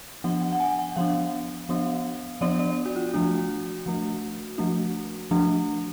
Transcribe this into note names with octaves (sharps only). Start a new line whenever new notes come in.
F3 B3 D4 F#5
F#5
F#5
G#5
F#5
F3 B3 D4 F5
F3 B3 D4
F3 B3 D4 D5
D5
F#4
F4
F3 A3 D4 F#4
F3 A3 D4
F3 A3 D4
F3 A3 D4